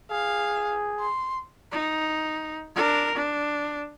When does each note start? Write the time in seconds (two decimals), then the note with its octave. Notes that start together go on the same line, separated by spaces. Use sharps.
0.11 G#4 F5
1.00 C6
1.72 D#4
2.75 D4 A#4
3.15 D4